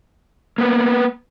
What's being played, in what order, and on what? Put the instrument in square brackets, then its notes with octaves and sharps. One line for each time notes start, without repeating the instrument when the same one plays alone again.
[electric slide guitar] A#3 B3 B4